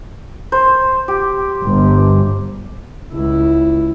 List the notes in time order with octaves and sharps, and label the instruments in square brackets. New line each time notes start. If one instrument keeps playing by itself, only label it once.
[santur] C5
G4
[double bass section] G1
[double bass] C#2 E4